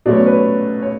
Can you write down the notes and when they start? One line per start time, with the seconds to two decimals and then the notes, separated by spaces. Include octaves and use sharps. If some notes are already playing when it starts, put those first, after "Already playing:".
0.06 B2 F#3 A3 C#4 D5
0.15 C#5
0.26 B4
0.35 C#5
0.82 C#5